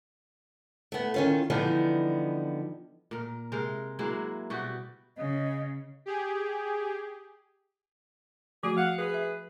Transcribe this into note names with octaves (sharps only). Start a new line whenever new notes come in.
A3 B3
D#3 C#4 F4
D3 E3 F3 G3 B3 D#4
A#2 A#4
C3 G#3 A#4 G5
F#3 G#3 A#3 E4
B2 G3 F#4 G4
C#3 D#5
G4 G#4
F3 A3 F#4 G#4
F5 F#5
G#4 B4
E5